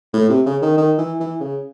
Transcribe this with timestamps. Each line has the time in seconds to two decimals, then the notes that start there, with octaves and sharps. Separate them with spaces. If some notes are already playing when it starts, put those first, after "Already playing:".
0.14 A2
0.30 C3
0.46 C#3
0.62 D#3
0.78 D#3
0.98 E3
1.20 E3
1.41 C#3